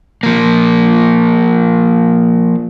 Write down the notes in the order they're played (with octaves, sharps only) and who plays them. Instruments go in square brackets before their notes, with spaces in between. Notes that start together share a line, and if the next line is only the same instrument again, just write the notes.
[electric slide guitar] F3 A#3